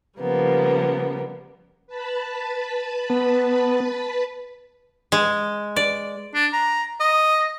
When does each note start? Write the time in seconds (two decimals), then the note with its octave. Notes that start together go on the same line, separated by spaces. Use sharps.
0.19 C#3 F3 G3 A#3 B3
1.87 B4 A5 B5
3.10 B3
5.12 G#3
5.76 D5
6.35 D4
6.53 A#5
7.00 D#5